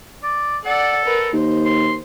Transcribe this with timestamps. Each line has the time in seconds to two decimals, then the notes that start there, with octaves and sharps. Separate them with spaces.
0.23 D5
0.65 A4 D5 F#5
1.05 A#4 B4
1.34 D#2 C5
1.66 C6